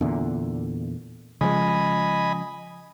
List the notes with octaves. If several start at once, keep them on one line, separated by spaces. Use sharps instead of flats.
E2 A#2 D3
C#3 F3 G#3 D#5 G#5 B5